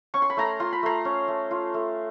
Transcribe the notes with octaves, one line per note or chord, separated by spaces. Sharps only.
C#4 C#6
C6
B5
A3 A#5 C6
F4 C6
B5
A3 A#5 C6
C#4
A3
F4
A3